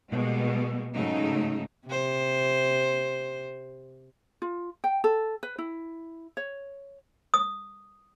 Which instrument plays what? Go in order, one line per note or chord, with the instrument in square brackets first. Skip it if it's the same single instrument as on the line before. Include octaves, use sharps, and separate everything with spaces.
[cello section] B2 G3 G#3 A#3
G#2 C#3 F#3 A3 D#4
[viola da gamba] C3 C5
[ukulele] F4
G5
A4
B4
E4
C#5
[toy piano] D#6